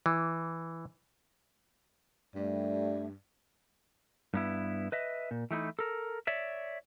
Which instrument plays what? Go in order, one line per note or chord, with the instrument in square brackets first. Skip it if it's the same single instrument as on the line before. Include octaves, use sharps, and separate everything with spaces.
[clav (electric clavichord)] E3
[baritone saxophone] G2 [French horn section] A#2 G3 D5 [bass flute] A3
[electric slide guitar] G2 B3 E4
B4 D#5 E5
A#2
E3 A3 D#4 E4
A4 A#4
C#5 D5 E5